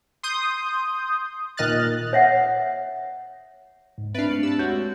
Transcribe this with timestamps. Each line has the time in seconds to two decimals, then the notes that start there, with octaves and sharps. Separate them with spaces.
0.23 C6 D#6 G6
1.57 A#2 D#3 D#5 F6 F#6 A6
2.13 C#5 E5 F#5
3.98 G#2
4.15 C4 D4 B4 E5 F5 A6 D7
4.30 A3 C#7 F#7
4.43 G4 A5 E6
4.59 G#3 F#4 C#5 G6